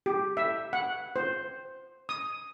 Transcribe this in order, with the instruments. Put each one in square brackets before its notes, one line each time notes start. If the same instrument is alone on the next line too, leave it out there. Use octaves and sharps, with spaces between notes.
[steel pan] G4
E5
F#5
C5
D#6